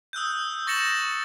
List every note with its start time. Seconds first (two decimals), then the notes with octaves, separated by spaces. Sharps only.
0.13 D#6 E6 F#6 G6
0.67 C#6 A6 A#6 C#7 E7 F#7